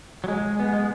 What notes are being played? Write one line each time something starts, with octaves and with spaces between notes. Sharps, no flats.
F#3
G#3
B3
G#3